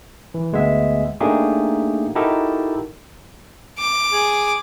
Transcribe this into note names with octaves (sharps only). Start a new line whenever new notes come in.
E3
D2 G#3 B3 E5
A3 A#3 D4 D#4 G4 G#4
D#4 E4 F#4 G4 A4 A#4
D6
G#4